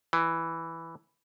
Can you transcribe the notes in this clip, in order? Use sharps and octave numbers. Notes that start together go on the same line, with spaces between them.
E3